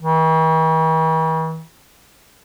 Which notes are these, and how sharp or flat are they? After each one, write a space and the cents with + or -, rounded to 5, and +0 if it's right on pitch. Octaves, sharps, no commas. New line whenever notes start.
E3 -45